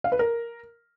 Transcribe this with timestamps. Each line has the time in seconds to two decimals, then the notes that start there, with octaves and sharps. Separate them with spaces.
0.04 F5
0.12 B4
0.19 A#4